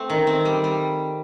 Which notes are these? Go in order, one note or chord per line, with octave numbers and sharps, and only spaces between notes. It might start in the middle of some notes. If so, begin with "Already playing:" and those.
Already playing: A3 C4
D#3
C4
G3
G3